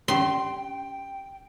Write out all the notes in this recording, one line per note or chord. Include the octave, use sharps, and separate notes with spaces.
C#4 G4 G5 C6